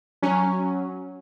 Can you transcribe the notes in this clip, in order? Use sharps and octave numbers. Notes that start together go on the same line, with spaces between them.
F#3 C#4